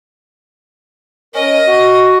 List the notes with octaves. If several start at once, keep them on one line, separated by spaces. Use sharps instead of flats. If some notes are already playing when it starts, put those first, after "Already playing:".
C#4 A#4 D#5
F#4